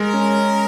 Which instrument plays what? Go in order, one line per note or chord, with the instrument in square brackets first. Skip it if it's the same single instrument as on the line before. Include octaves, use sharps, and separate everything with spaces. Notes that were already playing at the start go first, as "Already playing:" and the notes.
Already playing: [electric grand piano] G#3 [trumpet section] A#4
[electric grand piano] C#4